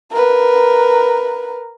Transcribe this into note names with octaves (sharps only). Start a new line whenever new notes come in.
A#4 B4